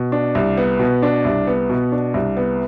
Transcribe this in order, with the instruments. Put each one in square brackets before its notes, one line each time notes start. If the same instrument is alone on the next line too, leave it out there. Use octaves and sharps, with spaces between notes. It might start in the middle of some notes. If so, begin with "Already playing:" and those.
Already playing: [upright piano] B2
D4
C2
B3
B2
D4
C2
B3
B2
D4
C2
B3